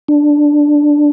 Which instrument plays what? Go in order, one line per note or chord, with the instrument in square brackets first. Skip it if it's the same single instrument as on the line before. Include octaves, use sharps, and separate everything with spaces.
[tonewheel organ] D4